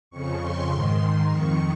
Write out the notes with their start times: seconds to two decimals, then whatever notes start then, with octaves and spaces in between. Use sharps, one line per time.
0.10 F2 C#3 C#6
0.40 C6
0.70 G#2 D#3 C6
1.00 C6
1.30 F2 D#3 C#6